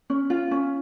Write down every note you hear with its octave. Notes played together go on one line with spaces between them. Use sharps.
C#4
F4
C#4